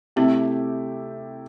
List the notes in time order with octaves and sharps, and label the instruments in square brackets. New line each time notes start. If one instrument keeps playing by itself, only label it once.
[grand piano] C3 A3 E4 G4 [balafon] C4